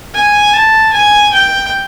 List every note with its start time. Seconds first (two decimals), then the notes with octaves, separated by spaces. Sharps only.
0.15 G#5
0.53 A5
0.93 G#5
1.33 G5